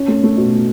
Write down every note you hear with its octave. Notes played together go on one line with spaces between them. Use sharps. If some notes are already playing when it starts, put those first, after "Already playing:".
Already playing: C#4
A3
A3
B2